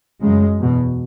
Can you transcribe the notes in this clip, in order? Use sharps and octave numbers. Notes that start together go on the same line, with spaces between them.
F#2 C#3 G#3
E2 B2